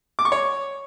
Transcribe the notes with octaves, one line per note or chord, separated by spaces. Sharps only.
D6
C#6
C#5